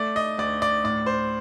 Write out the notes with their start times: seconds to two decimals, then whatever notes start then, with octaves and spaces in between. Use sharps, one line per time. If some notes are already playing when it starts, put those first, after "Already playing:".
Already playing: A3 D5
0.16 D#5
0.38 D2 D5
0.62 D5
0.84 A2 D5
1.06 C5